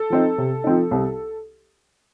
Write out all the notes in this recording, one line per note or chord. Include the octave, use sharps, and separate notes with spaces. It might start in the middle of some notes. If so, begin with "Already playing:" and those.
Already playing: A4
F3 C4 D#4
C3
F3 C4 D#4
C2